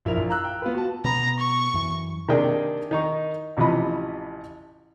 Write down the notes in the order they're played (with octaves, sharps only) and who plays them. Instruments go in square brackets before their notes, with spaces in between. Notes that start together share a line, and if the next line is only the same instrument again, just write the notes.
[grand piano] A#1 E4 A#4 F7
A#1
F5 A#5 E6 F#6
G5
B3 F4 B4
F#4 A5
[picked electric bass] B2 B3 [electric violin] A#5
[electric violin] C#6
[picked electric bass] F#2 E3
[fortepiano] C3 D#3 A#3 D4 G#4 G5
D#3 D#4 C#6
A1 C3 E3 F3 D#5 B5